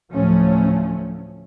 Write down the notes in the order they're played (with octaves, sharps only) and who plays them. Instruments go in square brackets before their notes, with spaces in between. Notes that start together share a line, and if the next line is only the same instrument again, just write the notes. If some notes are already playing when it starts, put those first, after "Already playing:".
[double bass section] D2 A2 F3 F#3 A3 C#4